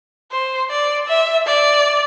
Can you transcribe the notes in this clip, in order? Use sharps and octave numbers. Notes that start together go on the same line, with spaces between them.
C5
D5
E5
D5